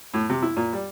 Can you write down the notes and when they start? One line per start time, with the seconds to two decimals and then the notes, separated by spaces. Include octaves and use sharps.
0.14 A2
0.29 C3
0.42 E4
0.56 A#2
0.73 G3